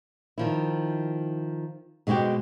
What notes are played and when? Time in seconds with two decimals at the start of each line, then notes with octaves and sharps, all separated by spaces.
0.38 D#3 F3 E4
2.07 B2 G#3 C4 F#4 G4